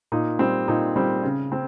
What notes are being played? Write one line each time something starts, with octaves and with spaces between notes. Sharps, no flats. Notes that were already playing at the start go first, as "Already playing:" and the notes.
A#2 D#4
G3 C4
A#2 D#4
G3 C4
C#3
C4